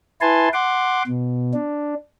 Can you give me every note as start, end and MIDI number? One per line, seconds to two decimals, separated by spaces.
0.21 0.49 64
0.21 0.49 71
0.21 0.49 80
0.21 0.49 81
0.21 0.49 84
0.53 1.03 78
0.53 1.03 84
0.53 1.03 86
1.07 1.53 47
1.54 1.94 62